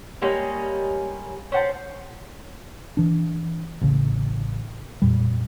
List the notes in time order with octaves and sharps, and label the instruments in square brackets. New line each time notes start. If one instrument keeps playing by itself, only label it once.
[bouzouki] G3 G#3 A#3 C#4
C#4 C5 F#5 A5
[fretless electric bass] E3 D4
A1 C#3
F2 A#2 G3